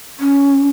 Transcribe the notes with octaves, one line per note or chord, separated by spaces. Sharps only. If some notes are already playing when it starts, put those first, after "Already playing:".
C#4